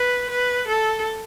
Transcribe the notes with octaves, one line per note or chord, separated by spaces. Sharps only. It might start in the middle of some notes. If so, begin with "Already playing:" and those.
Already playing: B4
B4
A4